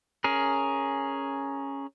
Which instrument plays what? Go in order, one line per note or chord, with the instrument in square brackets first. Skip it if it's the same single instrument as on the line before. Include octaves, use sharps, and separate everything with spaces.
[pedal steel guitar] C#4 G#4 A#4